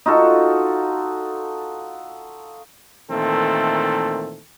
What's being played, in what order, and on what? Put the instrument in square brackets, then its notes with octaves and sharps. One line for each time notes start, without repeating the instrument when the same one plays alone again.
[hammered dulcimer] D#4 F4 F#4 A4
[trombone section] A#2 D#3 E3 A3 C4 A4